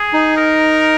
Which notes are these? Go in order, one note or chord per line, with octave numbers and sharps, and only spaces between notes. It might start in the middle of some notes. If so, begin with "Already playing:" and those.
Already playing: G#4
D#4
A#4